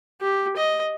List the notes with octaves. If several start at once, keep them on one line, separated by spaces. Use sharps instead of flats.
G4
D#5